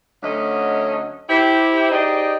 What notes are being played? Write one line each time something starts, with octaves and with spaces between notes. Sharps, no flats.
D2 D3 F#3 C#4 D#5
E4 G4 C5
D#4 G4 G#4 C5 D5 D#5